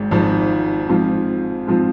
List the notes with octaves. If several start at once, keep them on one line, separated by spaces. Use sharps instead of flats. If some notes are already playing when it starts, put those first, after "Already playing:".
Already playing: G#1 G#2
G#1 G#2 F3
G#2 F3 C4 F4
G#2 F3 C4 F4